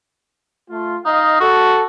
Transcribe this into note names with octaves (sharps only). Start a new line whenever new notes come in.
A3 F4
D#4 D#5 F5
F#4 A4